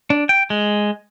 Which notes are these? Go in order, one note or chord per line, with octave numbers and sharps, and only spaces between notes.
D4
G5
G#3